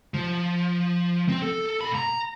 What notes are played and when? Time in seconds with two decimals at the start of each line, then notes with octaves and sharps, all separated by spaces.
0.14 F3
1.29 C4
1.42 A4
1.81 A#2 B5
1.95 A#5